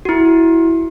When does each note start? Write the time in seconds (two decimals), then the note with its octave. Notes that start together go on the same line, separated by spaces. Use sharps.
0.05 E4 F#4